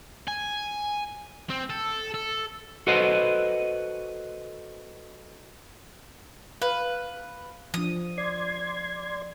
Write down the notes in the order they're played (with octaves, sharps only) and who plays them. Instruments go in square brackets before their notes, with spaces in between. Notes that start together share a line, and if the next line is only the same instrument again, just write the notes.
[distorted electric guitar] G#5
C4
A4
A4
[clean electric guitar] F#4 A4 B4 C5 D#5 F#5
[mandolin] B4 [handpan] F5
[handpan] F3 D4 [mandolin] D#6
[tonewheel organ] D5 C6 G#6